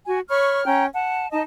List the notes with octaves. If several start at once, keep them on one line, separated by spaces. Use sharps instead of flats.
F#4 G#5
C#5 B5 C#6 F6
C#4 G5 A#5
F#5 A5
D#4 D#5 A5